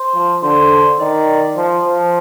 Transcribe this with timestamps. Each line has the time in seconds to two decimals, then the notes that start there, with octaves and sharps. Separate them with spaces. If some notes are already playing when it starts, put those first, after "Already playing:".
Already playing: C5
0.14 F3
0.42 D3 C5
0.99 D#3 D5
1.56 F3 C5
1.85 F3